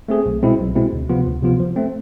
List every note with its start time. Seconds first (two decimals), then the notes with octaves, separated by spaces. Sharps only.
0.08 A3 C4 G#4
0.26 B1
0.43 B2 G#3 C4 E4
0.59 B1
0.76 B2 G#3 C4 E4
0.93 D2
1.09 C3 F3 B3 F4
1.26 D2
1.42 C3 F3 B3 F4
1.60 F3
1.76 A3 C4